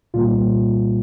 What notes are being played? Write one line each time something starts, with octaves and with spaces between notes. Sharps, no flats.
C2 A#2 G3 A#3 F4